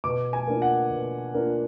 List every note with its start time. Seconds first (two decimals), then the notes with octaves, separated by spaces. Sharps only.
0.04 B2 D6
0.33 G#5
0.47 A#3 D4 F4
0.62 F#5
0.90 B2
1.34 A#3 D4 F4